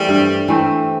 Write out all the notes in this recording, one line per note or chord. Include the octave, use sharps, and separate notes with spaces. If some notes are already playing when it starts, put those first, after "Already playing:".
Already playing: E3 G3 A3 C4
G2
E3 A3 C4